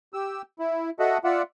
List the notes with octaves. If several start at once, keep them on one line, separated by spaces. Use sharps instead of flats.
G4 E6
E4
F#4 A4 D#5 E5 F#5
F4 D5 E5 F#5